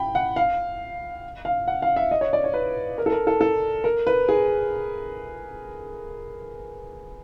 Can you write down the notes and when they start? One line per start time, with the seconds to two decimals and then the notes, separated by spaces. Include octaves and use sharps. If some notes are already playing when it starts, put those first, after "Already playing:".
Already playing: G5 B5
0.15 F#5
0.36 F5
1.45 F5
1.68 F#5
1.82 F5
1.96 E5
2.11 D#5
2.21 C#5
2.33 D5
2.44 C#5
2.54 B4
2.98 A#4
3.06 A4
3.12 A#4
3.27 A4
3.41 A4
3.84 A#4
4.07 B4
4.29 G#4